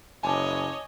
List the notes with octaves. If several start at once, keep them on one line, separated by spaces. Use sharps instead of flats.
F#1 C#5 D#5 G#5 A5 D6